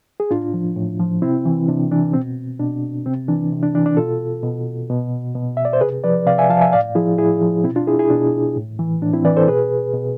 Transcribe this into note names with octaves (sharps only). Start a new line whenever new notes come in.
G#4
A2 D4 F4
F3
A2
F3
C3 C4 E4
E3
C3 D4
E3 D4
B2 C4
B2 D4
C3 C4
E3 D4
C3
D4
E3 D4
D4
B2 F4 A4
B2
B2
B2
E5
D5
C5
C3 G#4 B4
F3 B4 D5
C3 D5 F5
E5 G#5
F3 F5 A5
E5 G#5
A2 D5 F5
F3 E4 G#4
A2 E4 G#4
F3
B2 C4 E4
D4 F4
E4 G#4
E4 G#4
B2 D4
A2
E3
A2 D4
C4 E4
E3 B4 D5
A4 C5
B2 G#4 B4
B2